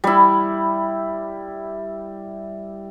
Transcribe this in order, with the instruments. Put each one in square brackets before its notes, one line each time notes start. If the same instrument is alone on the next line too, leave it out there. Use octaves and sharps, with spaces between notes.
[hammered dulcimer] G3 E4